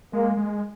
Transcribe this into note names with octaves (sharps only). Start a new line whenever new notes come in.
G#3 A#3
G#3